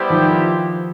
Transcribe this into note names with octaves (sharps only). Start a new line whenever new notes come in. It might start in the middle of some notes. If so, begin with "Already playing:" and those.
Already playing: G3 B3 E4 G4 C5
D#3 F3